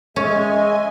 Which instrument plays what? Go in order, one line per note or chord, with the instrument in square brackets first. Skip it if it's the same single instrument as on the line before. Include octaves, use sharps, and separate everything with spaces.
[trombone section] G#3 [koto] C#4 [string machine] D#5 G#5 [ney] E5